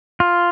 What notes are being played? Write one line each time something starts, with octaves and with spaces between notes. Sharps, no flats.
F4